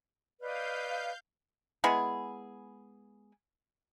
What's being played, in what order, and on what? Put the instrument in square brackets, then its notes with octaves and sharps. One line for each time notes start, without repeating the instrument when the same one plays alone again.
[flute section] B4 D5 D#5 [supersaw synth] F5 G6
[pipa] G#3 B3 E4 G#4